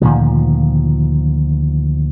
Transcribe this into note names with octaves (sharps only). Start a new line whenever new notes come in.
D2 A#2 D#3 F3